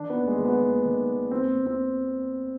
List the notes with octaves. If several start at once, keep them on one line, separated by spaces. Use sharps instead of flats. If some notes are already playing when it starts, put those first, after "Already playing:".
Already playing: D#3 D4
B3
D#2
G#3
D#3
B3
D#2
D#3
D#2
D#2 C4
D#2
C4